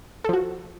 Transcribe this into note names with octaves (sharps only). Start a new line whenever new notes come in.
F3 F#4 A4